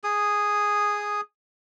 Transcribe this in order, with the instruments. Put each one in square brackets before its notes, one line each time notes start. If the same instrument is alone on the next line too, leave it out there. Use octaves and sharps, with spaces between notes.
[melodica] G#4 D#6